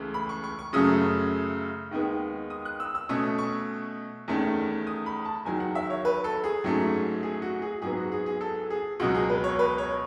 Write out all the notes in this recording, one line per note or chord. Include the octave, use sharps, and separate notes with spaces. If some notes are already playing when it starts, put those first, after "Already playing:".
Already playing: C#2 C#3 E3 A3 C#4
B5
C#6
C#6
C#6
F#2 C#3 F#3 A3 C#4 D#6
D#2 D#3 G#3 B3
D#6
F#6
E6
E6
B2 A3 C#4 D#6
C#6
E2 D#3 A3 C#4
D#6
B5
A5
E2 D#3 F#3 G#5
F#5
E5
C#5
B4
A4
G#4
G#2 F#3 A3 C#4
G#4
F#4
G#4
G#2 F#3 B3 G#4
F#4
G#4
G#4
A4
G#4
C#2 B2 F#3 F#4
G#4
B4
C#5
B4
C#5